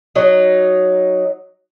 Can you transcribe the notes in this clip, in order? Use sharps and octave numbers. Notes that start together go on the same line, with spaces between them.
F#3 D#4